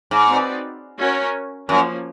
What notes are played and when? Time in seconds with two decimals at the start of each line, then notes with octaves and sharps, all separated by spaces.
0.11 G#2
0.28 C4 D#4 F#4 B4 D5
0.99 C#4 F#4 A#4 C#5
1.69 F#2 F3 A#3 C#4